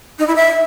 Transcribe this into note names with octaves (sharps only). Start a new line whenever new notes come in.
D#4
E4
E5